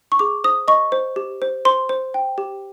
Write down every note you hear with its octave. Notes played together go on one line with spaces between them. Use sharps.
C#6
G#4 D6
C5 D#6
D#5 C#6
C5
G4
C5
C5 C6
C5
G5
G4